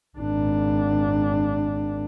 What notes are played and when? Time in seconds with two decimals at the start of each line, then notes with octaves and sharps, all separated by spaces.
0.19 G#1 D4